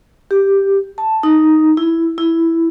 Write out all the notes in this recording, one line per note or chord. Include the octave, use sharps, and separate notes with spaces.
G4
A5
D#4
E4
E4